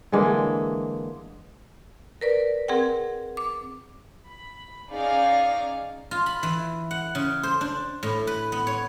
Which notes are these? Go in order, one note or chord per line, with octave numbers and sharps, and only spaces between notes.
D3 E3 G#3 A#3
A#4 B4 D5
C4 G#4 A#4 F#5 G5
D6
B5
C#4 D#4 G#4 D5 F5
F4
B5
E3
F#5
C#3
C5
D4
A2
B4
B3
C#5